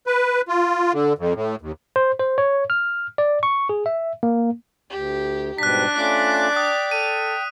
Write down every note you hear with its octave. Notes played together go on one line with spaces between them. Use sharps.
B4
F4
D3
F2
A2
D#2
C5
C5
C#5
F6
D5
C#6
G#4
E5
A#3
D2 G4
G#2 B2 G3 D4 F#6 B6
A3 C#4 F4 D5 D6
G5 D#6
A4 D#7